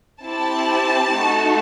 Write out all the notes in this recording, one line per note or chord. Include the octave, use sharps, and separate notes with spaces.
C4 E4 G4 A5
A3 D#4 F#4